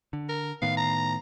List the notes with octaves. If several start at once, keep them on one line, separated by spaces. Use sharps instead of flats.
D3
A#4
A2 D#3 B3 F5
A#5